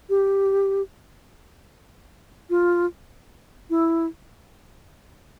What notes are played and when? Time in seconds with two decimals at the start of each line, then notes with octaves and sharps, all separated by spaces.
0.10 G4
2.50 F4
3.70 E4